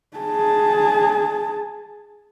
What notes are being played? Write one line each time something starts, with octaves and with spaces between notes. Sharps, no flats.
G#4 A5